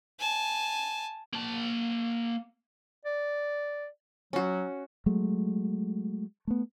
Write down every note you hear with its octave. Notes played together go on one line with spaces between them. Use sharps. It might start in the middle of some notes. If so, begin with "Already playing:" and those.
G#5 A5
A#3 A5
D5
F#3 C#4 F#4
F#3 G#3 A3
A3 B3